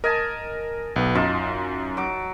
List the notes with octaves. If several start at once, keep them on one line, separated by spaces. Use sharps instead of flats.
A#4 D#5 G#5 A5
B1 B3
F#2 D#4 F4 A5
F#3 D6